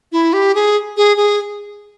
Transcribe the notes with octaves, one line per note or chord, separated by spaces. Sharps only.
E4
G4
G#4
G#4
G#4